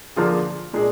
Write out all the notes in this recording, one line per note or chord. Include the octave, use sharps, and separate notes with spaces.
D3 F3 A#3 F4 G#4
A#2 G#3 D4 G#4